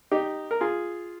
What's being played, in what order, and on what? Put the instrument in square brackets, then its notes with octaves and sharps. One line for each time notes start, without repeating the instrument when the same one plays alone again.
[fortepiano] D#4 G4
A#4
F4 G#4